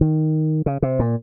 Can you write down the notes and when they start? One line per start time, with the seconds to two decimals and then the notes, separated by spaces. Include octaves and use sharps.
0.01 D#3
0.66 C#3
0.82 C3
0.99 A#2